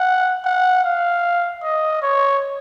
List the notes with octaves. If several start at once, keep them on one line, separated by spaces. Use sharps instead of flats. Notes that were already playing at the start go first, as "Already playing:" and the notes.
Already playing: F#5
F#5
F5
D#5
C#5